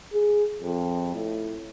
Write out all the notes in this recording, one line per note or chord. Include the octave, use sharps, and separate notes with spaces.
G#4
F2
A2